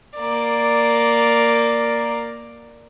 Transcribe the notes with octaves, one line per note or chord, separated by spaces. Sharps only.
A#3 D5